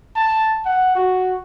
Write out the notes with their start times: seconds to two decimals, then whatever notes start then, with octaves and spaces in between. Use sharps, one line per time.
0.16 A5
0.65 F#5
0.95 F#4